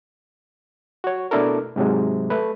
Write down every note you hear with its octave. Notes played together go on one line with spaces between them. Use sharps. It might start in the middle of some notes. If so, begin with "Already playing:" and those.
F#4 C#5
B2 A3 D4 E4 A4 A#4
G#2 C3 F#3 G#3
A3 B4